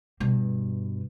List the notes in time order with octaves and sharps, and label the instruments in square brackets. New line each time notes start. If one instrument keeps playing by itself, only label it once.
[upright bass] G2 B2